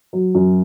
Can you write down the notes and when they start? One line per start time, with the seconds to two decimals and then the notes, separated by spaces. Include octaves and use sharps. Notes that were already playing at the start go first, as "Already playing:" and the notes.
0.13 F#3
0.35 F#2